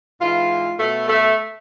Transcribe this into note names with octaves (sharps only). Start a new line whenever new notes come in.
G#2 E3 F4
B2 A3
A3